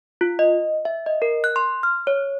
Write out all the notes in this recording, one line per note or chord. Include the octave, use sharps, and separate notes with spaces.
F4
D#5
E5
D#5
A#4
F#6
C6
F6
C#5